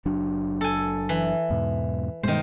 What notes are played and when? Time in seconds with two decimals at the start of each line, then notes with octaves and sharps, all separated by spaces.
0.05 F#1 F#3 D4
0.61 A4 G#5
1.09 E3
1.50 E2 G#2 B2
2.23 G2 B2 D#3 G#3 C5